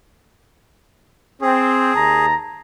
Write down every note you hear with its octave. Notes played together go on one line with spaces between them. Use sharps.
C4 G#4
D#2 A5 A#5